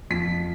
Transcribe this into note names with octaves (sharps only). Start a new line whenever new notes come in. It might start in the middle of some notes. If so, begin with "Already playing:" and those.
F2 F3 B6